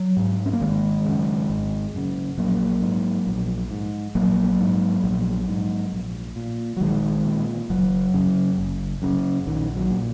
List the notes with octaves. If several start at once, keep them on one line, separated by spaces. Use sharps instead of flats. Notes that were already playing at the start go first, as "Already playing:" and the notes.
Already playing: F#3
G#2
C#4
A#3
G#1 D#3 G#3
F#2 C#3
G#1
F#2 C#3
A#1 F#3 A#3
G#2
A#1
G#2
A#1 F#3 A#3
G#2
A#1
G#2
A#1
A#2
F#3
A#1 D#3 G#3
A#2
F#1 F#3
F#2 C#3
F#1
F#2 C#3
A#1 D#3
F#3
A#2